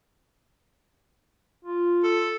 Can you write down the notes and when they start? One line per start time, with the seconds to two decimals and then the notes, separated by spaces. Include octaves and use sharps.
1.65 F4
2.04 A4